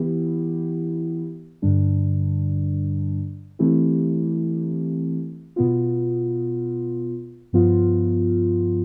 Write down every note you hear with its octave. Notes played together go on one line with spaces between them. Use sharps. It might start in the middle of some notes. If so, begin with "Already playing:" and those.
Already playing: E3 B3 E4 G4
G2 D3 G3 D4
E3 A3 C4 E4 G4
B2 B3 F4
G2 F3 B3 F4